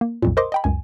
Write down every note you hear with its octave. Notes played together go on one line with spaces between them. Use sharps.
A#3
B1 F2 A#2
A#4 C5 D#5 C6 D6
D#5 G5 B5
C#2 F#2 G#5